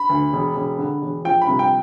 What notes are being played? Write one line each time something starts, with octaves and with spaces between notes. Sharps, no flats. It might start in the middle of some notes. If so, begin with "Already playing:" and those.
Already playing: B5
D2
E1
E1
D3
E1
F3 G5
B5
C2
G5